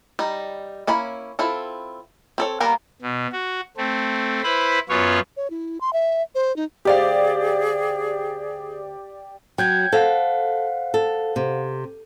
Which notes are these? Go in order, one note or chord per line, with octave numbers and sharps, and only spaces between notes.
G3 D#4
A#3 C#4 E4 B5
C4 E4 F4 A4
C4 A4 C#5
G3 A#3 B3 A#4 F5
B2
F#4
A3 C4
E4 B4 C5 B5
F#2 B3 F4 C#5
C#5
E4
C6
E5
C5
D#4
D2 G4 G#4 C5 D5 F5
F#3 G5 G6 G#6
A4 C5 F5 F#5
A4
C3